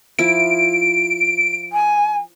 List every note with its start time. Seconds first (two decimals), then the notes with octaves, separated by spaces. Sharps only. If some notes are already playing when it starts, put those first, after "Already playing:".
0.19 F3 E4 D7
1.72 G#5